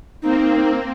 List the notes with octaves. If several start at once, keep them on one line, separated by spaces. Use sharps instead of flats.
A#3 C4 D#4